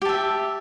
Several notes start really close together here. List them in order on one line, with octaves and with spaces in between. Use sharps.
G4 A5 E5